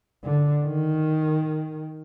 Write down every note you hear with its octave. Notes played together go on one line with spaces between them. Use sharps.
D3
D#3